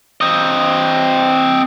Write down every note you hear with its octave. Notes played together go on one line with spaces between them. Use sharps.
C4 D#5